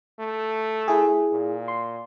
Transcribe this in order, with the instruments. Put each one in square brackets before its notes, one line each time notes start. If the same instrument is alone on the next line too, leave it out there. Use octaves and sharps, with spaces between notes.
[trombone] A3
[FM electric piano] E4 G#4
[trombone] A#2
[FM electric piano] C6